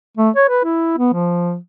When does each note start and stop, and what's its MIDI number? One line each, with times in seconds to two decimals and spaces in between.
0.17 0.30 57
0.36 0.46 73
0.49 0.64 71
0.64 0.97 64
0.97 1.12 59
1.14 1.57 53